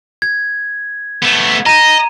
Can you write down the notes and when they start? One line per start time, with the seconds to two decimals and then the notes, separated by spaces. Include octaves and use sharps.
0.22 G#6
1.23 A3 B3
1.66 D#5 A#5 D#7